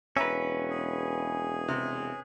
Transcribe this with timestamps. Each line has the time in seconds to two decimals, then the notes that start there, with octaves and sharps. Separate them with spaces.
0.17 E1 C#4 B4 E5 A#5
0.70 G#4
1.68 C3